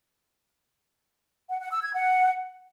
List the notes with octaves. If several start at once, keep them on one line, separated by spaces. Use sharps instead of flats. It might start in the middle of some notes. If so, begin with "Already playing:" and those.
F#5
F#5
E6
G#6
F#5